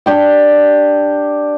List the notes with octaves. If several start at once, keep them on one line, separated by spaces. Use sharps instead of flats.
D4 G4 G5